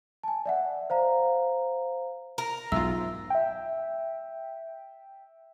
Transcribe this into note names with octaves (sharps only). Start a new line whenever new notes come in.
G#5 A5
D5 E5 F#5
C5 F5 A#5
A#4
B1 G#2 F4 E5 E6
E5 G5